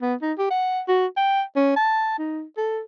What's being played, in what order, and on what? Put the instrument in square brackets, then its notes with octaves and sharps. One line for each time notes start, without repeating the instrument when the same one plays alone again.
[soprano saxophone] B3
D#4
G4
F#5
F#4
G5
C#4
A5
D#4
A4